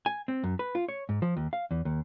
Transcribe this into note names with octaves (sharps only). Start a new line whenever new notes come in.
G#5
C4
F#2
B4
F4
C#5
G#2
F3
D#2
F5
E2
D#2